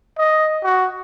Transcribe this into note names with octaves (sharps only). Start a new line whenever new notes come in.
D#5
F#4